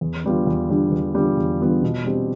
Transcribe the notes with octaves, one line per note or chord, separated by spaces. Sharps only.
E2
D3 G3 B3 F4
E2
D3 G3 B3 F4
E2
D3 G3 B3 F4
E2
D3 G3 B3 F4
B2
G3 C4 G4